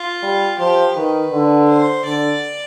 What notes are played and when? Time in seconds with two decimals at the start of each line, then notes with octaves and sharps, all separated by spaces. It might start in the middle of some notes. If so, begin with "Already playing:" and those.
Already playing: F4
0.23 G3
0.59 F3 G4
0.96 D#3 B4
1.32 D3
1.69 C5
2.05 D3 D5